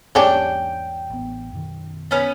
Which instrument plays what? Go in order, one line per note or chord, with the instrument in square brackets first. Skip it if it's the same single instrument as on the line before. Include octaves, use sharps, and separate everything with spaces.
[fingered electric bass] E2 G#2 A#3 [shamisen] G3 C#4 D4 [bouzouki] G5
[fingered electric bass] A1 B3
F#2 B2 D#3
[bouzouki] B3 C#4 B4